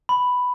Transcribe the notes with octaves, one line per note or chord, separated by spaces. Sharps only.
B5